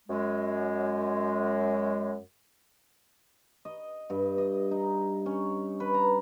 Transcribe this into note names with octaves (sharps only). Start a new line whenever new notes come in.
F#2 G#3
D#5
G2
D#5
D#4
C#4
B4
A#5